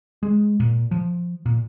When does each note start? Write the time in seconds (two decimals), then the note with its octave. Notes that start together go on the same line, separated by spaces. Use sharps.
0.23 G#3
0.60 A#2
0.91 F3
1.46 A#2